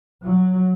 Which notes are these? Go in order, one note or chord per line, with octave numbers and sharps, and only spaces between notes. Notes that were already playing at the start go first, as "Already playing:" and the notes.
F#3